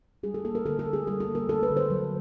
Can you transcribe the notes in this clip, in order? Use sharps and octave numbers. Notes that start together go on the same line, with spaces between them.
G3 G#4
A4
A#3 A4
A#4
D3 A4
A4
D3
G#4
G3 A4
A4
A#3
A#4
D3 A4
B4
D3
C5
F#3